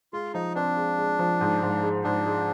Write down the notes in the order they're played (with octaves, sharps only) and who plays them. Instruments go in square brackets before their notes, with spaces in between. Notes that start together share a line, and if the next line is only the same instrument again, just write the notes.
[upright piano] G#3 [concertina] F4
[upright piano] F3 [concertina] D#4
[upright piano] C4 [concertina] D4
[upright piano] G#3
G#3
F3
G#2
G#2
G#3
[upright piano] G#2 [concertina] D4
[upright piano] G#3